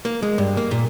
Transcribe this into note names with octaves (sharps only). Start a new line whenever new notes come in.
A#3
G#3
G2
A#3
A#2